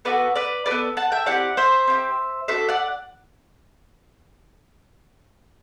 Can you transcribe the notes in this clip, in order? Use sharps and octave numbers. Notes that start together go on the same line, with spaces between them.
B3 F#4 A4 B4 D5
B4 D5
F#4 A4 B4 D5
B3
F#5 A5
E5 G5
C4 E4 G4 D5 F#5
C5 E5
C4 E4 G4
D4 F#4 A4 C5 E5
D5 F#5